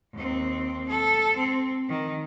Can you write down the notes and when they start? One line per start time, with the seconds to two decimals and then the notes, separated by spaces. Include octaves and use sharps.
0.13 D#2 C4
0.89 A4
1.37 C4
1.89 D#3